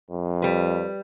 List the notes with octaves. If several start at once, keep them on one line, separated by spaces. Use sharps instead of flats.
F2
G3 B4